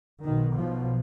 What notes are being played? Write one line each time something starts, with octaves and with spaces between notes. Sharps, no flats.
B1 B2 D#3
F3